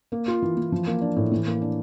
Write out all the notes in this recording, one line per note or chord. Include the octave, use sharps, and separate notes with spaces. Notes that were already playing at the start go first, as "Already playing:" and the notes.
A#3
F4
E3
E3
F3
A#3
D4
A2
E3
A#3
D4